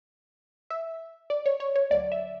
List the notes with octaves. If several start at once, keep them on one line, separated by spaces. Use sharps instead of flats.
E5
D5
C#5
C#5
C#5
D2 D3 F#3 D5
E5